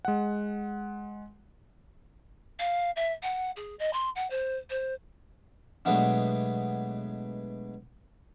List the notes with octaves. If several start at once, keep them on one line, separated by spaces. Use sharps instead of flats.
G#3 F#5
F5
E5
F#5
G#4
D#5
C6
F#5
C5
C5
B2 F#3 G#3 A3 B3 D4